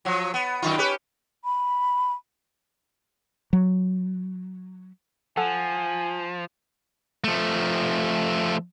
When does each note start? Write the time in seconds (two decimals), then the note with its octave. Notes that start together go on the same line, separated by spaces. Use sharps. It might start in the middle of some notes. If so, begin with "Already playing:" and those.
0.05 F3 F#3
0.34 B3
0.62 F#2 D#3 F4
0.78 C#4 G4 B4
1.44 B5
3.53 F#3
5.37 F3 A4 F#5 G#5
7.24 F3 A3